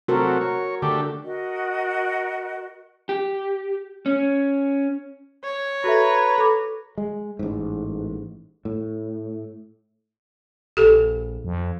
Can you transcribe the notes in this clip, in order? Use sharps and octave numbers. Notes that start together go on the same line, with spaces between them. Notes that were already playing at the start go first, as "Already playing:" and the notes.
C3 F#3 A3 F#4 A#4
C#5
D3 A3 D4 G4
F#4 A#4 D#5
G4
C#4
C#5
F#4 A4 B4 E5 A#5
A4 B5 D6
G#3
A1 G#2
A2
A#1 G4 A4
F2